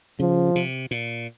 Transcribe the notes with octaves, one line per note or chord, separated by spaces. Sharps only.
C#3 F3
C3
A#2